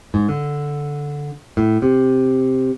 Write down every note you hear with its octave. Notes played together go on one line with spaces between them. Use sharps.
G#2
D3
A2
C3